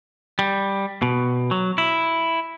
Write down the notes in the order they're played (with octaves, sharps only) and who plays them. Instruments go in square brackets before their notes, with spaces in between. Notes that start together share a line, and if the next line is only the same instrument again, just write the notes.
[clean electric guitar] G3
B2
F#3
E4